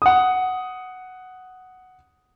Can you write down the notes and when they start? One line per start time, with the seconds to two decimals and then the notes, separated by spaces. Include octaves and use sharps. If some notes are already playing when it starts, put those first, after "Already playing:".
0.02 F#5 D#6